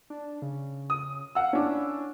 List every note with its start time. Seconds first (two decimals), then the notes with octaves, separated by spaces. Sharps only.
0.10 D4
0.42 C#3
0.90 D#6
1.35 F5 F#5 E6
1.53 C#4 D4 E4